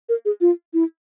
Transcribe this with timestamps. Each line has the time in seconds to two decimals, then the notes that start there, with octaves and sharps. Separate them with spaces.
0.09 A#4
0.25 G#4
0.41 F4
0.74 E4